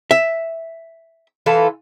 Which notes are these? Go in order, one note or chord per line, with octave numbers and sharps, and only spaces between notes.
E5
E3 F4 A4